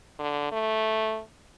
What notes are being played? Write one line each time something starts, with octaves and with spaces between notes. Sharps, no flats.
D3
A3